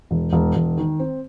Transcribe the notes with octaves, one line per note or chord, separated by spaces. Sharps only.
E1
E1
E1
D#3
C4